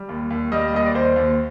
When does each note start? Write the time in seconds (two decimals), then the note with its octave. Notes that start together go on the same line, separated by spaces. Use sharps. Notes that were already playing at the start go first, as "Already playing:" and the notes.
Already playing: G3
0.09 D#2
0.30 D#2
0.52 G3 D#5
0.74 D#2 D#5
0.86 D5
0.94 D#2 C5
1.16 D#2